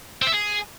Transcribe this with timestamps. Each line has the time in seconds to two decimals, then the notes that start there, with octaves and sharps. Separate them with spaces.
0.22 C4
0.27 E5
0.32 G#4